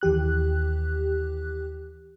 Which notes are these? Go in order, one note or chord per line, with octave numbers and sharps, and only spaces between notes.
D#2 E3 G4 F#6